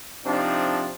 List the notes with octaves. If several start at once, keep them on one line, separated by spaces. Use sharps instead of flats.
C3 F3 C4 D4 D#4